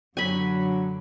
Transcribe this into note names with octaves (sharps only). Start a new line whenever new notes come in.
F#2 D3 F#3 G#5 B5